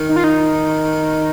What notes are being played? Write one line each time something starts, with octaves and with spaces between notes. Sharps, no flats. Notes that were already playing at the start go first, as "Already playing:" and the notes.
Already playing: D#3
D#4
F4
D#4